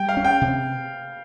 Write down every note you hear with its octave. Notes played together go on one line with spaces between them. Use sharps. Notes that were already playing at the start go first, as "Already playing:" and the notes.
Already playing: G3 G5
F5
C#4
G5
C3